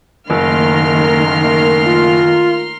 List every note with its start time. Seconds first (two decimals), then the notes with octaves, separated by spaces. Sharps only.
0.30 F#1 D#3 A3 A#3 A#4 C6 F6
1.86 F4